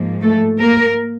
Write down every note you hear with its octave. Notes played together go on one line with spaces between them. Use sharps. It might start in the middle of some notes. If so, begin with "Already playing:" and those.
Already playing: G#2 F3 A#3
A3 A4
A#3 A#4